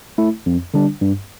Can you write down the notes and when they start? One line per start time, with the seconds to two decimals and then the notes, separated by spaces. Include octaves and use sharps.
0.18 A3 E4
0.46 F2
0.74 D3 G3 D4
1.01 G2